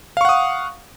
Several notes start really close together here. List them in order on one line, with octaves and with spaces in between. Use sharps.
F5 C#6 F#5 D#6